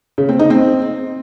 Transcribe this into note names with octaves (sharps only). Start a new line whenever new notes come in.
C#3
C4
D#4
C4